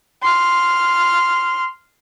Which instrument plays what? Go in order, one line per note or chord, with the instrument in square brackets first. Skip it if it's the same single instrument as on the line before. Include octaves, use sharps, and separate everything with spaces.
[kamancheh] C6 F6